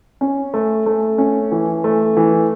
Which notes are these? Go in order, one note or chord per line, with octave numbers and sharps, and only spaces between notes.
C#4
A3
A3
C#4
E3
A3
E3